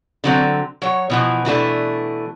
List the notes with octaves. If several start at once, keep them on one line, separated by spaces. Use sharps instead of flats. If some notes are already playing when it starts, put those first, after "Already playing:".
D3 F#3 C4
F#3 C#5
B2 E3 F3
B2 E3 A3 D4